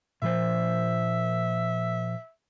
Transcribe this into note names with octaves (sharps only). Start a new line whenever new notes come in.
A#2 F3 C5 E5